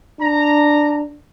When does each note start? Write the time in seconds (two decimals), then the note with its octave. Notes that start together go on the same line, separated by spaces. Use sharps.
0.20 D4 A#5